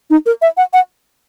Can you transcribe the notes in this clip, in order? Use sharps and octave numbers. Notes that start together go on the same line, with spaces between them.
D#4
A#4
E5
F#5
F#5